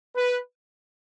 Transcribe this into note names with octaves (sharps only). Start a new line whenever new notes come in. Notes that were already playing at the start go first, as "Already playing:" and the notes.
B4